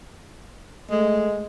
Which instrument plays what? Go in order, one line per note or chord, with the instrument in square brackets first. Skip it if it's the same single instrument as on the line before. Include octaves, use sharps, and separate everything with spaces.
[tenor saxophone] G#3 [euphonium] A3